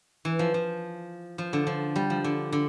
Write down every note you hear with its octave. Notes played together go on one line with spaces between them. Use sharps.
E3
F3
F3
F3
D3
F3
G3
F3
D3
D3